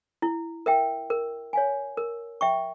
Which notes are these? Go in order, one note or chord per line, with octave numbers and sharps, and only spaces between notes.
E4
A#4 E5 G5
A#4
C#5 F5 G#5
A#4
E5 G5 C#6